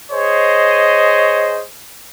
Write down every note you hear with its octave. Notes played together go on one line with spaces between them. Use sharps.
G#4 C5 C#5 D#5